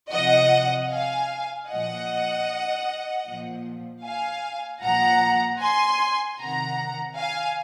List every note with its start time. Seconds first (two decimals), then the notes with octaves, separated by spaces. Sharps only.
0.12 C3 F3 D#5 F#5
0.90 F5 G#5
1.69 A#2 F3 D#5 F#5
3.26 A#2 F3
4.04 F5 G#5
4.82 A#2 F3 F#5 A#5
5.61 G#5 C6
6.39 C3 D#3 F#5 A#5
7.18 F5 G#5